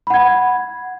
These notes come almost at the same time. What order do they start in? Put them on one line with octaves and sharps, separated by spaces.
B5 F#5 G#6